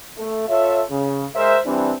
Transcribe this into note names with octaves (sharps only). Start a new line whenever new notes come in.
A3
F4 A4 C#5 E5
C#3
G#3 A#4 C5 E5
E3 G3 C4 D4